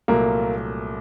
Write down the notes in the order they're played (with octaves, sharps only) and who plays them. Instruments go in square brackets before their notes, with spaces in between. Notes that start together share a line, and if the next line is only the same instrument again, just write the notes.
[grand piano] C2 A#2 F#3 A3 [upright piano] A#3